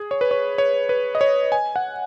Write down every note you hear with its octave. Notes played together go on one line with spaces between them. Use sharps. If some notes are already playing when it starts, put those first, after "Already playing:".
Already playing: G#4
C#5
B4
C#5
C#5
B4
D#5
C#5
G#5
F#5